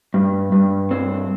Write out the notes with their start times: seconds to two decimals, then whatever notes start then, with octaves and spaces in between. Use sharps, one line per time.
0.14 G2
0.52 G2
0.91 C4